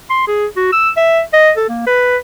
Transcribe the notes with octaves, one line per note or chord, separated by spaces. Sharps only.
C6
G#4
F#4
E6
E5
D#5
A4
A#3
B4